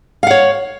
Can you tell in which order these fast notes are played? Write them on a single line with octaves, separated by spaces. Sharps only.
F5 F#5 C#5